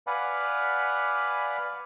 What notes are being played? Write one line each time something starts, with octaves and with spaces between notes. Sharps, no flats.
B4 D5 F5 F#5 G#5 B5